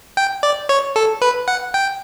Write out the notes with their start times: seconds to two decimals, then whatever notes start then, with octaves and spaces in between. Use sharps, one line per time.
0.17 G5
0.43 D5
0.69 C#5
0.96 A4
1.22 B4
1.48 F#5
1.74 G5